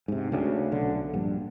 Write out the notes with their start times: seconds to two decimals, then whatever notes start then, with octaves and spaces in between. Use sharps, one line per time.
0.08 G#2 C3
0.32 D2 C#3
0.72 B1 D3
1.13 A#1 G2